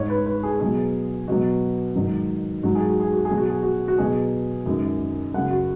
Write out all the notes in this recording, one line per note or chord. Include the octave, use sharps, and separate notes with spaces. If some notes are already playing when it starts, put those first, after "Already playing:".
Already playing: G#2 G#3 C#5
B4
B4
G#4
B2 F#3 G#4
B2 F#3 F#4
G#2 D#3 F#3
G#2 F#3 F#4
G#4
F#4
G#4
F#4
G#4
B2 F#3
F#4
G#4
F#4
F#4
B2 F#3 G#4
F#2 D#3 G#3
F#2 C#3 F#3 F#5
F#4